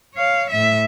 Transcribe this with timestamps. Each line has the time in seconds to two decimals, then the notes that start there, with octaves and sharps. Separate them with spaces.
0.15 C#5 F5
0.50 A2 E5